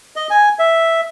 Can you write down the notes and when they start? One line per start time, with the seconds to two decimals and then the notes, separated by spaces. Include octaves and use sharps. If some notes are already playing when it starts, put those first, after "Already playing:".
0.16 D#5
0.30 G#5
0.59 E5